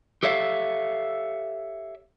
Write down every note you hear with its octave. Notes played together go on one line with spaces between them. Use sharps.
G4 A4 C#5 E5 F5